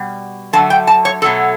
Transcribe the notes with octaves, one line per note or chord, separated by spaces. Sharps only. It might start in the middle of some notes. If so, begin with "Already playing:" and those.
Already playing: B2 G3
D3 F#3 A3 A5
G5
A5
C#5
B2 F#3 A3 A4